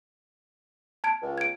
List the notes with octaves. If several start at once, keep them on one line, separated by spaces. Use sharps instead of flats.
A5 G#6 D7
C#2
G#6 D7